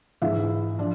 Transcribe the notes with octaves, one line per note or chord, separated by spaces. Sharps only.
G#2 E3 E4 E5
F3 D4 D5